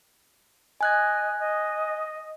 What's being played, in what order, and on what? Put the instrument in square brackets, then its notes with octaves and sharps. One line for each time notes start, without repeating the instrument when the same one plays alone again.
[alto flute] D#5 [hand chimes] G#5 F#6 G#6
[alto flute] D#5